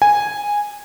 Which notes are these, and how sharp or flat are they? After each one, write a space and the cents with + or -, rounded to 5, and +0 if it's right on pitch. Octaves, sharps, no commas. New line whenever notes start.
G#5 -10